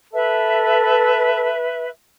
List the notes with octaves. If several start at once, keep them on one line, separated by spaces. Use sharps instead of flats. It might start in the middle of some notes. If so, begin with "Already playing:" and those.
A4 B4 E5